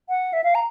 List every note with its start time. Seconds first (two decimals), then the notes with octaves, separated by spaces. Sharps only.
0.09 F#5
0.33 E5
0.44 F5
0.55 A#5